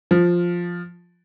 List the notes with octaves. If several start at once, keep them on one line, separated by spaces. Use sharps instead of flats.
F3